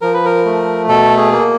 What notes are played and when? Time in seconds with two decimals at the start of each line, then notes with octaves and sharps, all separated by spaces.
0.02 F3 A#4
0.14 B4
0.26 A#4
0.45 A3
0.88 B2 A4
1.18 G#4
1.32 A#3